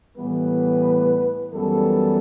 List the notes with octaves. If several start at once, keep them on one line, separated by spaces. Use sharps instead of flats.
A2 E3 G3 B3 B4
F#2 E3 G3 B3 A4